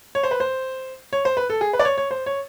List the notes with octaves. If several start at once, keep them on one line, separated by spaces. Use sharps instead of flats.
C#5
C5
B4
C5
C#5
C5
B4
A4
G#4
B4
D5
C#5
C#5
C5
C#5